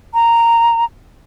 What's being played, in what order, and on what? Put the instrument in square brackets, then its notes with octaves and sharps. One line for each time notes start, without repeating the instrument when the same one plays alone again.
[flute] A#5